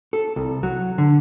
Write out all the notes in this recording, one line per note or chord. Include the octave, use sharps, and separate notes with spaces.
A4
C2
F#3
D3